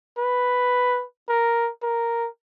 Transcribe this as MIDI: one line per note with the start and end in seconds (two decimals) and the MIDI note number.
0.18 1.04 71
1.29 1.71 70
1.83 2.28 70